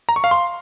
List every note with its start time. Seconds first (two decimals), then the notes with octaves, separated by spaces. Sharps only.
0.09 A#5
0.16 C#6
0.24 F5
0.31 C6